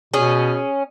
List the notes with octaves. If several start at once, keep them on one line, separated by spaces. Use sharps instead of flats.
B2 C#4 G#4